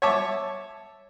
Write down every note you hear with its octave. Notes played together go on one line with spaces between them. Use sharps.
C#5 E5 A5 D6